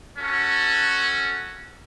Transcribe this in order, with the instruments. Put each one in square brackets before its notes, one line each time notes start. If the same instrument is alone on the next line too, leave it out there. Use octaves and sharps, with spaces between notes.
[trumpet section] C#4 F#4 A4